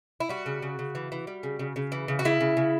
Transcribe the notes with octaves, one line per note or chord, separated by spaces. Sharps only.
E4
G3 F#4
C#3
C#3
C#3
E3
E3
G3
C#3
C#3
C#3
E3
C#3
F#4
C#3 E4
C#3
C#3